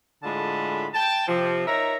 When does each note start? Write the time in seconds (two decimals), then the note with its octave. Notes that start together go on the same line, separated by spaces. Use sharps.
0.23 A2 D3 G#3 F4 A5 B5
0.94 G5 A5
1.27 C3 F3 C4
1.66 D#4 A#4 C#5 E5 A#5